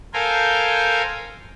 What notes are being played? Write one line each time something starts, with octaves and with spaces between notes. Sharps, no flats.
A4 A#4 C5 F5 G5 G#5